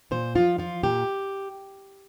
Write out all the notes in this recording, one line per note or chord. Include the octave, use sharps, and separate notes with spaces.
A#2 C5
F3 F4
F3 F4
A#2 G4